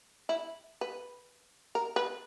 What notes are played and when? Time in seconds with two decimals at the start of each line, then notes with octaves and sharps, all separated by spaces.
0.29 E4
0.81 B4
1.75 A#4
1.96 B4